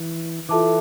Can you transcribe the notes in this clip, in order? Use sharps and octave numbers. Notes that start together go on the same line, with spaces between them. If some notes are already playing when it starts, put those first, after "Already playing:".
Already playing: E3
E3 F4 A4 E5 A5 D6